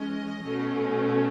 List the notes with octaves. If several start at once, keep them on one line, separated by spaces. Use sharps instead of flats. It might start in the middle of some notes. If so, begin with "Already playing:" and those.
Already playing: E3 G#3 C#4 D#5
B2 A3 C#4